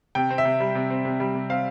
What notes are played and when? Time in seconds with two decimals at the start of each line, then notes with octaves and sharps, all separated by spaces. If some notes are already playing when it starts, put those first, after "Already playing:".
0.15 C3 G5
0.30 C4
0.38 E5
0.45 C3
0.60 G3
0.75 C3
0.90 C4
1.05 C3
1.20 G3
1.35 C3
1.50 C4 F5